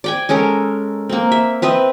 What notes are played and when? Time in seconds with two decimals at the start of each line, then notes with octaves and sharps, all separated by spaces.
0.04 D5 G5 G#5
0.29 G#3 C#4 A4 A#4
1.09 A#3 C4
1.32 E5
1.62 C4 B4 D#5 E5